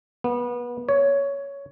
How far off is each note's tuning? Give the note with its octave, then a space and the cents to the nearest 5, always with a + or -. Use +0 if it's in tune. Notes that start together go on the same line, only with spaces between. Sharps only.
B3 -25
C#5 +10